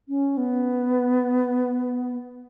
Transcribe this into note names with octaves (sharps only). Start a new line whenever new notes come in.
C#4
B3